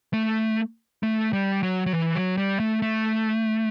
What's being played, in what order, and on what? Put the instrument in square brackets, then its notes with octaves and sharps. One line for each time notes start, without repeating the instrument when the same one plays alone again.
[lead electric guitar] A3
A3
G3
F#3
F#3
E3
F#3
G3
A3
A3